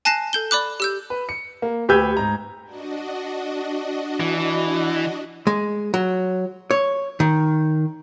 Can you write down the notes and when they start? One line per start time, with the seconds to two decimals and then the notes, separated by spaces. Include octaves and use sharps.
0.05 G#5 A5 F#6 A#6 C7 E7
0.33 A4 G6 G7
0.51 D5 B5 D6 F#6
0.80 G4 E6 G6
1.10 B4
1.29 C#7
1.62 A#3
1.89 D2 G4 B4 E6 G6 G#6
2.17 G#2 A#5
2.64 D4 F#4 D#5
4.20 E3
5.47 G#3
5.94 F#3
6.71 C#5
7.20 D#3